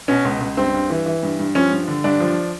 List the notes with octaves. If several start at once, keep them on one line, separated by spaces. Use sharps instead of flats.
B2 C#4
C#2
C#2
G2 C4
G2
E3
E3
G2
G2
F3 C#4
G2
D3
G2 D4
F3